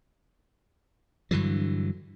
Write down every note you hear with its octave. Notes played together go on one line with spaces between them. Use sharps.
G2 D3 E3 F#3